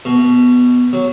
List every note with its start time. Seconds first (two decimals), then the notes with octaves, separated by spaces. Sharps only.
0.05 B2
0.93 F#3